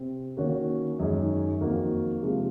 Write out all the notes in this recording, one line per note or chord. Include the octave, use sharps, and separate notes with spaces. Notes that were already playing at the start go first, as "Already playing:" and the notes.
Already playing: C3 C4
D#3 A#3 C#4 F#4 C#5
F#2 D#3 G#3 D#4 G#4
F2 D#3 A#3 D#4 F#4
C3 F3 G#3